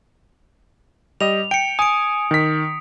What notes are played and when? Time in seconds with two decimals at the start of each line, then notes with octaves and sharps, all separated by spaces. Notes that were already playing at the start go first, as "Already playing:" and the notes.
1.21 G3 D#5 F7
1.51 G5 C#7 D7
1.79 G#5 D#6 D7
2.31 D#3 B6